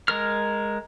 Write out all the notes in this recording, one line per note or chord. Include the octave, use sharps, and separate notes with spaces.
G#3 A#4 F6